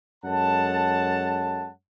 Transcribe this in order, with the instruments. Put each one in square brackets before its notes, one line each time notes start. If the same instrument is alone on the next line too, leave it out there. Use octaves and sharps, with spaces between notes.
[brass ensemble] F#2 G#3 A4 C#5 F#5 A5